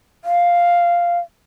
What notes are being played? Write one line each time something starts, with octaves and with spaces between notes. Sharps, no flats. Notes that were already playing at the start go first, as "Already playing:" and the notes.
F5